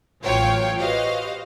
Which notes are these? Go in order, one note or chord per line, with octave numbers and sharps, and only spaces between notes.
A1 F#3 F4 C#5 F5 G5
F#4 G4 B4 C5 D#5 F5